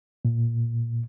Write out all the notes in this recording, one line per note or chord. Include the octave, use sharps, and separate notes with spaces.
A#2